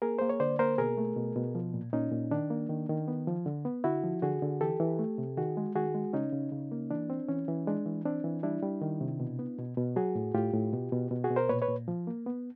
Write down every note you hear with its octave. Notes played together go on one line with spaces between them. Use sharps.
A#3 G#4 A#4
A#3 C5
C#5
D3 C5 D5
A#3 A#4 C5
B2 G#4 A#4
A3
B2
B2
F3
A#2
A#2 C#4 D#4
A#2
D#3 D4
A#3
D#3
D#3
B3
F3
D3
B3
D3 E4 F#4
F3
D3 F#4 G#4
D3
E3 G4 A4
E3
A3
C3
D#3 F#4 G#4
G#3
D#3 F#4 G#4
G#3
C#3 C#4 D#4
C#3
C#3
A#3
E3 D4
C4
E3 C#4
E3
G#3 D4
E3
C4 D4
E3
G3 D4 E4
G3
D#3
C3
B2
B3
B2
B2
F#3 F#4 G#4
A2
A2 F4 G4
A2
B2
B2
B2
F#4 G#4
B2
A#4 C5
A#2 B4 C#5
B4 C#5
A#2
F3
A#3
B3